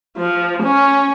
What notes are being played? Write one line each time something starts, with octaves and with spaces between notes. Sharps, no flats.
F3
C#4